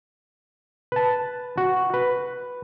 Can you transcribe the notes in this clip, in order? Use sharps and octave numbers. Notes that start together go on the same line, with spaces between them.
B4 A5
F#4
B4